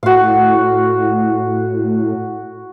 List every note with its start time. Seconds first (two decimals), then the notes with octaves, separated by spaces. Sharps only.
0.03 A2 F#4 F5